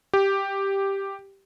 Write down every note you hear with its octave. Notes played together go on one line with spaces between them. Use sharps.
G4